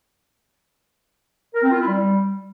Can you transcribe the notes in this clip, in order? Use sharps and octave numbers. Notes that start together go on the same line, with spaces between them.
A#4
C4
F4
E4
G3